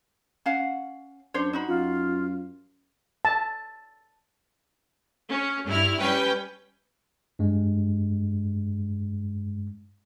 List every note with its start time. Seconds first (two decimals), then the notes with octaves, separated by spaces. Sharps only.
0.46 C#4 F5 F#5
1.34 F#2 D4 C5 C#5
1.53 D#4 F#4 B5
1.68 F#2 F4
3.25 A5
5.28 C#4
5.67 G2 E4 F6
5.98 G3 C#4 B4 G5
7.39 G2 G#3